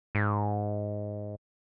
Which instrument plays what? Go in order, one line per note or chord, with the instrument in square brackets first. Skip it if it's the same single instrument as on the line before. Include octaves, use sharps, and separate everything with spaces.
[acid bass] G#2